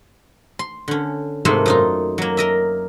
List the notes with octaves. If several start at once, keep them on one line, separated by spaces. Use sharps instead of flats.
C6
D3 C#4
G#2 C3 A3 A#3 C4 C6
F#2 D#4 F4
F#3 A#3
A#4 D#5 E5